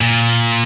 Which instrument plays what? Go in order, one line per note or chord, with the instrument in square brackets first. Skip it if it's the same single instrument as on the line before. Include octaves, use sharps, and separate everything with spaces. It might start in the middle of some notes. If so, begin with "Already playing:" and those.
[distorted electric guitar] A#2